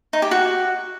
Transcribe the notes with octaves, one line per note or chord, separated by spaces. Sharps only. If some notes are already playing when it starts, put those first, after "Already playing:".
D#4
G4
F#4